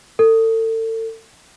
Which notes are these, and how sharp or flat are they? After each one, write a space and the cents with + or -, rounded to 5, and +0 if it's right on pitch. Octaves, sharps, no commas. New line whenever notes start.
A4 +35